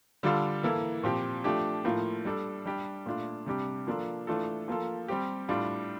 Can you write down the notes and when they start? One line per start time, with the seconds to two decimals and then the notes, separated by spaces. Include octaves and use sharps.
0.23 D3 G3 D4 F4 A4
0.63 E3 A#3 E4 A4
1.03 A#2 F3 C4 G4
1.44 F3 A3 D4 G4
1.85 A2 F3 A#3 F4
2.25 G3 D4 A4
2.66 G3 D4 G4
3.06 A#2 A3 D4 F4
3.46 C3 G3 D4 G4
3.87 F3 A#3 D4 F4 A4
4.27 E3 A3 D4 F4 A4
4.68 F3 A#3 F4 A4
5.08 G3 C4 G4
5.49 A2 G3 D4 F4